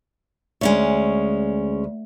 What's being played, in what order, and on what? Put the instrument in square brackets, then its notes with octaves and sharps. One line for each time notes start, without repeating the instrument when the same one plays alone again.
[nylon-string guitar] D2 [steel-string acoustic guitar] G#3 C#4 C#5